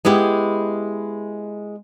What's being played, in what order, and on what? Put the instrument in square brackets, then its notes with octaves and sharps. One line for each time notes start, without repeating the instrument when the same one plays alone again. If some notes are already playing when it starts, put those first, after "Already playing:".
[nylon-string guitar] G#3 B3 E4 G4